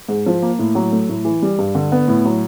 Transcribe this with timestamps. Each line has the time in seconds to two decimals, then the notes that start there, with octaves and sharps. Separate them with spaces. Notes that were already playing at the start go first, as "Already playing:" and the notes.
0.09 G#2
0.26 F3
0.42 A#3
0.59 A2
0.75 F#3
0.92 A3
1.09 A2
1.25 E3
1.42 G3
1.59 G2
1.75 D3
1.92 B3
2.08 A2
2.25 F#3